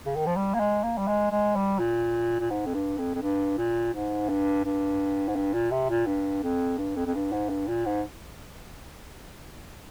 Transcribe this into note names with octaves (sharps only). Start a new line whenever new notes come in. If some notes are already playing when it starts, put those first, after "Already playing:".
C#3
D#3
F3
G3
A#3
G#3
A#3
G3
G#3
G#3
G3
A#2
A#2
G#2
F2
G2
F2
F2
G2
A#2
G#2
G2
G2
G#2
G2
A#2
C3
A#2
G2
F2
G2
F2
F2
G2
G#2
G2
A#2
G#2